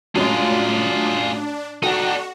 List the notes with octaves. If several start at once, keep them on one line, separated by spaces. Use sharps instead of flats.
F#2 A2 G#3 D4 F4 G#4
D4 D#4 F#4 A4 F#5 G5